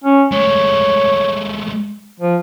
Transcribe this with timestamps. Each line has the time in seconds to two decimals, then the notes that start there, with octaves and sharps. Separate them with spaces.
0.04 C#4
0.32 G#3 A3 C#5
2.20 F3